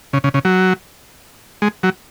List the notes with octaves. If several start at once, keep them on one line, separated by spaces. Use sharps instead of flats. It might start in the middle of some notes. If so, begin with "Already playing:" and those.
C#3
C#3
C#3
F#3
G#3
F#3